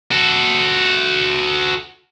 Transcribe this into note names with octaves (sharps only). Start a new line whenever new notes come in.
F#4 A4